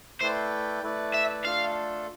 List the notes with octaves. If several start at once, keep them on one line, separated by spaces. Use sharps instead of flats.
A3 E4 B4 C5 D5 G5
A3 E4 B4 D5
E5
A3 D4 F4 A4 F5